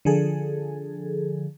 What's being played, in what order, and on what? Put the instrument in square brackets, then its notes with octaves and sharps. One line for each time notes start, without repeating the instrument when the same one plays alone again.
[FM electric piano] D3 F3 G#4 A4